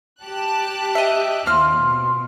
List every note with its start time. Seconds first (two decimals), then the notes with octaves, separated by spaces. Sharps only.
0.22 G4 A5 F#6
0.95 D#5 E5
1.46 D#2 C4 F4 F6
1.78 B2